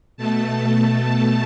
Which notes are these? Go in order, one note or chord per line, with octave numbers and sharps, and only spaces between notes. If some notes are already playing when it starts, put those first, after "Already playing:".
B2 A3 A5